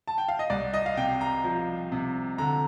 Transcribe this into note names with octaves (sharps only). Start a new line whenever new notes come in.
A5
G5
F5
D#5
C2 D5
D#5
F5
C3 G5
A#5
F3
C3
D3 A#5